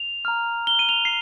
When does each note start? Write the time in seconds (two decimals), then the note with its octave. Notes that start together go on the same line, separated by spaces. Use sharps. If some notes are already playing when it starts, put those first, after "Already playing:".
Already playing: F7
0.25 A#5 F6
0.67 G7
0.79 D#7
0.89 F7
1.05 C7